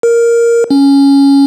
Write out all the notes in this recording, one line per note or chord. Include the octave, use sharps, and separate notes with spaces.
A#4
C#4